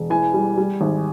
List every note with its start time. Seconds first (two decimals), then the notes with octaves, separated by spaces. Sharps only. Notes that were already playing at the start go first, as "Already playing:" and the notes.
Already playing: E1
0.10 E3 G#5
0.34 G3
0.57 G3
0.81 G#1